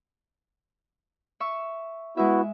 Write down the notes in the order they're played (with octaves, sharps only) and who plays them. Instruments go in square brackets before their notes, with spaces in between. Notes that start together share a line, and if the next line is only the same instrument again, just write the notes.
[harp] E5 C#6 E6
[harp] G#3 E5 [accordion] B3 E4 F#4